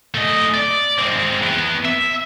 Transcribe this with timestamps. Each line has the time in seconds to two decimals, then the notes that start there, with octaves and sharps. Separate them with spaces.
0.14 A3 D#5
0.54 D5
0.99 G#3 C4
1.42 E3 B3
1.85 E5